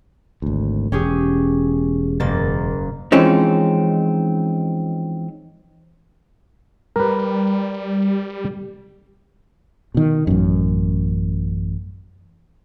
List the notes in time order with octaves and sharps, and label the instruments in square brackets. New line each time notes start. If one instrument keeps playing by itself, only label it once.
[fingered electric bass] G#1 D2
[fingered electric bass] E1 [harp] C#4 G4 G#4
[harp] F#1 A#3 A6
[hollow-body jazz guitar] E3 F3 G#3 C4 C#4 D#4
[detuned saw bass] G3 [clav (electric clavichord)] A#4 B4
[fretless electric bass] B2 D#3
A1 F#2